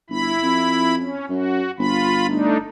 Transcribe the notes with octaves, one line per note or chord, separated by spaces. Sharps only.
G1 E4 B5
F2
C#4
F#2 F#4
G1 F4 B5
A3 D4 D#4